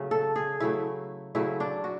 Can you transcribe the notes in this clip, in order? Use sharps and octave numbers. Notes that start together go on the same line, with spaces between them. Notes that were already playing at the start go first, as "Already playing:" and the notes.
Already playing: C#3 F#3 A3
A4
G#4
C#3 F#3 A3 E4
C#3 F#3 A3 E4
D4
F#4